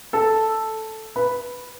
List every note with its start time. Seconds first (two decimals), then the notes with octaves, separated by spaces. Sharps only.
0.13 A4 A5
1.16 B4 B5